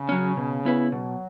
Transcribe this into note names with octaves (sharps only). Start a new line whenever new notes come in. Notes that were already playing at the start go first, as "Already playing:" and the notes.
Already playing: C#3
F#3 C#4
B2
B3 E4 B4
B2 F#3